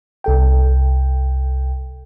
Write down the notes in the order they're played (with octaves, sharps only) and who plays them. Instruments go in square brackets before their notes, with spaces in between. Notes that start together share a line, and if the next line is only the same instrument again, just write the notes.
[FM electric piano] C2 A4 G5